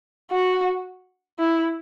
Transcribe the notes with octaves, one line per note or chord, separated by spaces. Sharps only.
F#4
E4